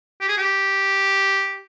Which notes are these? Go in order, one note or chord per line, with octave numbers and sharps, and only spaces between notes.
G4
G#4
G4